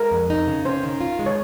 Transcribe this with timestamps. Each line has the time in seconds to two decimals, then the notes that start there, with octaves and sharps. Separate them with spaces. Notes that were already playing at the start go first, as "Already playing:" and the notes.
Already playing: G#3 A#4
0.11 F2
0.30 D#4
0.47 C#3
0.65 C#4 C5
0.83 D#3
1.01 F4
1.19 G#3
1.26 C#5